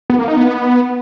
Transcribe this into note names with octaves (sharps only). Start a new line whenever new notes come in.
B3
A#3
D#4
B3